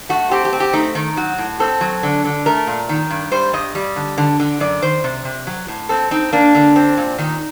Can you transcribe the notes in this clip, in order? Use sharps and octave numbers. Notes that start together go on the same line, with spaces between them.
A3 F#4
C4 G4
G4
C4
G4
A3 D#4
D#3 D#4
F#3 F#4
A2
C4 A4
F#3
D3
D3
A3 A#4
A#2
D#3
G2
G3 C5
G2 D#5
G3
D3
D3
D3
F#2 D5
D#3 C5
C3
C3
F#3
A2
C4 A4
C4 D#4
A#3 D4
D3
C4
A#2
D#3 D#4